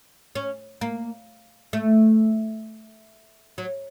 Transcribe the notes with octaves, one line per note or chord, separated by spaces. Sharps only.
C#4
A#3
A3
F#3